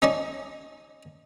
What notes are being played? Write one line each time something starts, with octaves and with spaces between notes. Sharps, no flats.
C#4 D#4 C#5 D5 A5